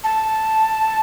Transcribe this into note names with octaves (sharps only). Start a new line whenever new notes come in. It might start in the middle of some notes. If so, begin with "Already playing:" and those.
A5